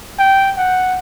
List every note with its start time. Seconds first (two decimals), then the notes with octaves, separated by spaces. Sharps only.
0.19 G5
0.57 F#5